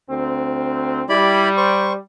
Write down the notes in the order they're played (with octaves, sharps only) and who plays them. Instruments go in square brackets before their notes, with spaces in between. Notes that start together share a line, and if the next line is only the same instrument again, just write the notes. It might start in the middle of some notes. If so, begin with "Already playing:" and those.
[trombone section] D2 C4
[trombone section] G3 [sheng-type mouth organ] E4 D5 B5
[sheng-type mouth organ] C5 C#6